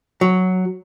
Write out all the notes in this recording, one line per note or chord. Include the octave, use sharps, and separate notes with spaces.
F#3